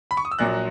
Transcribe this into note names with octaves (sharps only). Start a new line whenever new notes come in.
B5
C#6
D#6
E6
A#1 A#2 F#3 F#6